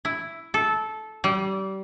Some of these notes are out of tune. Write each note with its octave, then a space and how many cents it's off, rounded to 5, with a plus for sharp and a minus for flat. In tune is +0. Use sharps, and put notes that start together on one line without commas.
E4 +5
A4 -15
G3 -30